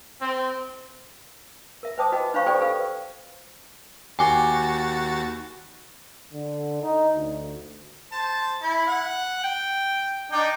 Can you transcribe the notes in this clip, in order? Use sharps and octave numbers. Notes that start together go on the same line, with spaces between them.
C4
A#4 E5
B4 C5 G5 A5 D6 D#6
F#4 B4 D#5 F#5 G5
D4 C5 C#5 F5 B5 C#6
G4 A4 B4 C5 D5 G5
A4 B4 F5
D#2 F#4 G5 G#5 D6 A6
D3
D#4
D2
C5 A5
E4
F#5
G5
D4 D#4 G5